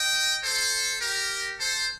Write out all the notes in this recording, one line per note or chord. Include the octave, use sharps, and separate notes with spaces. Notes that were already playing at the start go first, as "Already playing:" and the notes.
Already playing: D#5 G5
A4 C5
G4 A#4
A4 C5